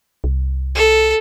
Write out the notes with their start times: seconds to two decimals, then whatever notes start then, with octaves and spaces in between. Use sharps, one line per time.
0.24 C2
0.75 A4